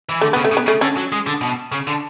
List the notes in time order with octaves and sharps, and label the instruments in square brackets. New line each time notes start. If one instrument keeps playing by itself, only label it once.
[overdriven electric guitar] E3
[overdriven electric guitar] D3 [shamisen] A3
[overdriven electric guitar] C#3 [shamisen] B3
[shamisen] A3
[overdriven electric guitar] C#3
[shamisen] B3
[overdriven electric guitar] C#3 [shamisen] A3
[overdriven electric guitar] D3 [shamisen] C#4
[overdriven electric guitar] F#3
G#3
D3
B2
C#3
D3